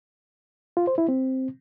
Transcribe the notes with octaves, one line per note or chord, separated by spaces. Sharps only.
F4
C5
E4
C4